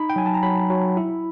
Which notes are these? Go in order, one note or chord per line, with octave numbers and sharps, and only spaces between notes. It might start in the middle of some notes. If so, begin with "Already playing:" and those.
Already playing: D#4 B5
G5
F#3 G#5
A5
A#5
F#3 B5
F#3
E4